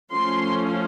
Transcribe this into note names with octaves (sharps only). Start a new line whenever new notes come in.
F3 A3 C#4 C6